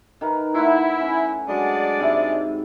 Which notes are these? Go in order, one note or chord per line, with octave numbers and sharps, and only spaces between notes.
D#3 A#4 B4
A3 E4 F#5 C6
C#4
F#3 G#3 D4 D5
G#2 C3 E4